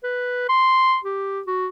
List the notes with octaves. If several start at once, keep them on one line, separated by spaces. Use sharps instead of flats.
B4
C6
G4
F#4